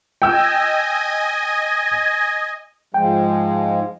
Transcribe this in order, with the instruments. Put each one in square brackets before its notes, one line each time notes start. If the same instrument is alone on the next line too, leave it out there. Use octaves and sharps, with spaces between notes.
[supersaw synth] D#5 G#5 [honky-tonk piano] G5 E6
[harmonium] G#2 F3 G#3 [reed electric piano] G5